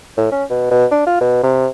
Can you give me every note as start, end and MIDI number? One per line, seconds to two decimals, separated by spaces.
0.17 0.27 45
0.31 0.44 61
0.50 0.70 47
0.71 0.86 47
0.91 1.03 62
1.06 1.20 65
1.21 1.42 47
1.43 1.67 48